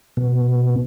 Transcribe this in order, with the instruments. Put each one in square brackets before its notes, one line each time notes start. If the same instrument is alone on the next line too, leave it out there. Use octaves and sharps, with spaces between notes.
[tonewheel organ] B2